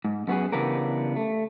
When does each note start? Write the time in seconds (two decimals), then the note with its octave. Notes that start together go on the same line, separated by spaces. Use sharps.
0.05 G#2
0.27 F#2 B3 F#4 G#4
0.52 C#3 E3 G3 B3 D4 A#4
1.16 A3